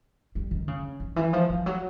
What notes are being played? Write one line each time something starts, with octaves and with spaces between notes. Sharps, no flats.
G3
D#3
C#3
D#3
E3
F3
F3
F#3